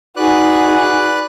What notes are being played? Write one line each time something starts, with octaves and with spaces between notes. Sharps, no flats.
D#4 F#4 G#4 B4 D5 F#6